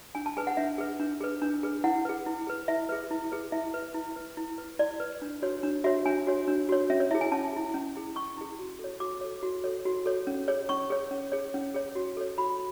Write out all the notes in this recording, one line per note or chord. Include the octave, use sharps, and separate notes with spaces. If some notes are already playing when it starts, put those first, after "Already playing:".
D4 G#5
A5
G#4 B4 G#5
F#5
D4 E5
G#4 B4
D4
G#4 B4
D4
G#4 B4
E4 F#5
G#4 B4
E4
G#4 B4
E4 E5
G#4 B4
E4
G#4 B4
E4 E5
B4
E4
B4
E4
B4
E4 D5
B4
D4
F#4 C#5
D4
F#4 C#5 E5
D4 G#5
F#4 C#5
D4
F#4 C#5
C#4 E5
C#5
E4 G#4 E5
G#5
C#4 A5
E4 G#4
C#4
E4 G#4
C#4 C#6
E4 G#4
F#4
A4 C#5
F#4 D6
A4 C#5
F#4
A4 C#5
F#4
A4 C#5
C#4
G#4 C#5
C#4 C#6
G#4 C#5
C#4
G#4 C#5
C#4
G#4 C#5
F#4
A4 C#5
F#4 B5